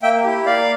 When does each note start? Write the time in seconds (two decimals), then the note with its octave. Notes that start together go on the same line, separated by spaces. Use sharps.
0.03 A#3 E5 G5
0.24 E4 G4
0.46 A#3 D5 F5